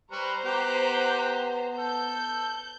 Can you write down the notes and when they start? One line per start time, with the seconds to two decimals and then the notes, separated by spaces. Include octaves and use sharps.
0.11 G3 B4 C5 A#5 C#6
0.45 B3 G4 F#5
1.78 A4 G6